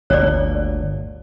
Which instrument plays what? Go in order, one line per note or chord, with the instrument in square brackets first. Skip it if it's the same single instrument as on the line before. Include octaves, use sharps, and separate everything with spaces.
[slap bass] G1 D2 A#2 [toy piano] C#5 D5